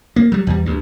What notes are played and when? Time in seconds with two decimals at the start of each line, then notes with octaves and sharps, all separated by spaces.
0.16 A#3
0.32 F#3 G3
0.47 E2 G3
0.66 D2 G2